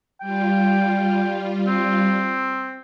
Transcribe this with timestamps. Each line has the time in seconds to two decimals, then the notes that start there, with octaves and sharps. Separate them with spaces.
0.21 G3 F4 G5
1.67 C4